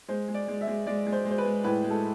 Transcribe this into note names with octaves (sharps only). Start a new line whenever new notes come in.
G#3 C5
G#3
D5
G#3
E5
G#3
G#3 D5
G#3
C5
G#3
C5
B4
G#3
A2 B4
G#3
A4